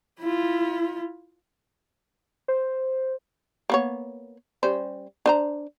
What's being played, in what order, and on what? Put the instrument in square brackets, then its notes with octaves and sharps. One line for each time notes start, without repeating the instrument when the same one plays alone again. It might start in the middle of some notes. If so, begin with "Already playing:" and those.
[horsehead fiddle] E4 F4
[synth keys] C5
[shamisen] A#3 B3 C#5
G3 C#4 C5
D4 C5 A#5